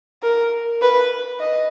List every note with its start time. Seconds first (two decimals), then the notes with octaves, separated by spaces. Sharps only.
0.23 A#4
0.82 B4
1.40 D#5